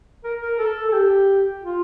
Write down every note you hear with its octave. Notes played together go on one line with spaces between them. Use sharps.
A#4
A#4
A4
A4
G4
F4